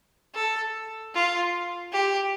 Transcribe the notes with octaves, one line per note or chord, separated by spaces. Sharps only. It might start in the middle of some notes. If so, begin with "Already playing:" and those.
A4
F4
G4